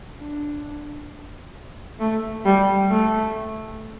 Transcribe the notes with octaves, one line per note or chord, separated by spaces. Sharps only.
D4
A3
G3
A3